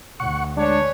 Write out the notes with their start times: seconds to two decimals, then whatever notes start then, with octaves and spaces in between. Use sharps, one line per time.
0.20 D2 F#5 C#6
0.57 G#3 D4 G#4 B4 C#5